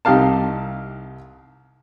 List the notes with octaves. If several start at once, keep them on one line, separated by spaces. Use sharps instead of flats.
C2 D#4 G4 F5 A5